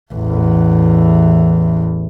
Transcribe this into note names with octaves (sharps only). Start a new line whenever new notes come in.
A1 E2